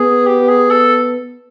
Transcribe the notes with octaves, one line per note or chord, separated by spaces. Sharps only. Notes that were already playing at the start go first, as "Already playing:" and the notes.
Already playing: B3 G#4
G4
G#4
A4